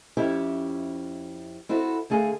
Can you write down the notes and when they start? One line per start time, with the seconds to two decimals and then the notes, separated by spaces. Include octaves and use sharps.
0.17 F2 C#4 E4 G4 E5
1.69 C4 E4 F#4 A4
2.10 D3 A3 G#4 F5 G#5